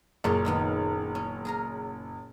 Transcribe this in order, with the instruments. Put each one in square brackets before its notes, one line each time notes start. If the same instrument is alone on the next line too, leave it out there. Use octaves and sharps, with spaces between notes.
[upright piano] F#1 [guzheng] A#2 C#5 C6
[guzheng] A#2 D#3 B3
C#4
G#4 A#4 A#5